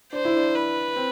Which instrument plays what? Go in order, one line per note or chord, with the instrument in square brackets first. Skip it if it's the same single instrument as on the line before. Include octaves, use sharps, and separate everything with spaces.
[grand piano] D4 [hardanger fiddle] C5
[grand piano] E4
D4
[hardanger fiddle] B4
[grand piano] C4